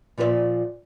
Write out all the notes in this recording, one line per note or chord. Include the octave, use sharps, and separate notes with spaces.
A#2 F3 F4 B4 D5 E5